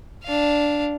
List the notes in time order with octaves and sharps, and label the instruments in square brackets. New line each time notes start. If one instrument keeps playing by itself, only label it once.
[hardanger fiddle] D4 F5